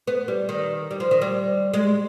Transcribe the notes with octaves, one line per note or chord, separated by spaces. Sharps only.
B3
G3
D#3
G3
F3
D#3
G3
G#3